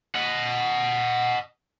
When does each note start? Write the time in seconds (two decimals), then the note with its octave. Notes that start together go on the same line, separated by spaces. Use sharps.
0.15 D#5 F#5